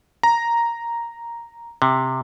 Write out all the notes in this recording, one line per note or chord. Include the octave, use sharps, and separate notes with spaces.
A#5
C3